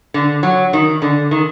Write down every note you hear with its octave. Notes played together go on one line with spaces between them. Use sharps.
D3
F#3
D#3
D3
D#3